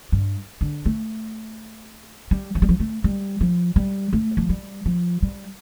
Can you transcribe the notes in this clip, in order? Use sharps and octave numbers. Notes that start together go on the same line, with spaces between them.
G2
D3
A3
G3
F3
G3
F3
A3
G3
F3
G3
A3
F3
G3
F3
G3